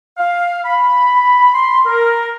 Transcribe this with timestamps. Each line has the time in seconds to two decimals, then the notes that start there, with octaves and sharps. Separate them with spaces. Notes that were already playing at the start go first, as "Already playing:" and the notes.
0.17 F5
0.65 B5
1.54 C6
1.86 A#4